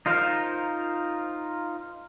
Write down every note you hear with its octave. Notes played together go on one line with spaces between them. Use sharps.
D#4 F4 A#4 C5 F5